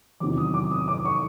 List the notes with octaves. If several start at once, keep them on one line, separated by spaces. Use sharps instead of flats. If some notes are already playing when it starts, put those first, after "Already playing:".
F1 E2 C3 D#3 F#3 D6
D#6
D6
D#6
D6
C#6